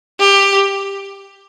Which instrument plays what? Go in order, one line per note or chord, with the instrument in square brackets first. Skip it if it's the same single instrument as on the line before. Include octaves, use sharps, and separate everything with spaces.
[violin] G4